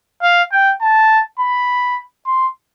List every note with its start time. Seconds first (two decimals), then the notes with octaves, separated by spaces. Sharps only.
0.22 F5
0.52 G5
0.82 A5
1.40 B5
2.26 C6